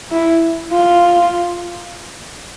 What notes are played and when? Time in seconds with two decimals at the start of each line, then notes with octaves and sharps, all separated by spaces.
0.11 E4
0.72 F4